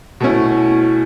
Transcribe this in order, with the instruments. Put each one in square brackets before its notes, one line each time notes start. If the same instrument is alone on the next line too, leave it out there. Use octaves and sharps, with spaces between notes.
[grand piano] B2 A3 C#4 E4